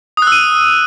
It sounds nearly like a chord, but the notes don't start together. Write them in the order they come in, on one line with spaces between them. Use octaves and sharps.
D#6 F#6 E6 D#7